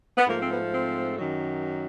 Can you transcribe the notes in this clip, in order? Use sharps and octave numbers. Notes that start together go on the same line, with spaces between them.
B3
G#2 F3 A3 A#3
C4
B3
C4
F#2 D#3 F#3